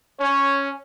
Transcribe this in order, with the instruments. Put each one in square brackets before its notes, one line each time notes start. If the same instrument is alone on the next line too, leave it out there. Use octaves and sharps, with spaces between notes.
[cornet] C#4 [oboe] C#5